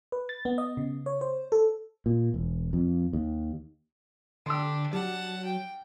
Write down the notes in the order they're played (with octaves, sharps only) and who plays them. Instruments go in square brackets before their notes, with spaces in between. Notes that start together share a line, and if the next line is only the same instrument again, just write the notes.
[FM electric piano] B4
A6
B3
D#5
C#3
C#5
C5
A4
[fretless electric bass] A#2
E1
F2
D#2
[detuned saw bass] D3 [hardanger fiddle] D4 G4 [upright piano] C6 E6
[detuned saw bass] F#3 [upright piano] G3 [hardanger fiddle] F#5 A5
[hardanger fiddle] G5